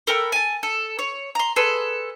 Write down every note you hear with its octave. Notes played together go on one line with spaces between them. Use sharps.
A4 A#4 G5 B5
G#5 A5
A4
C#5
A#5 C6
G#4 A4 B4 C6